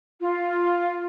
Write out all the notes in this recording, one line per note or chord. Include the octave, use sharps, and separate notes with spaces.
F4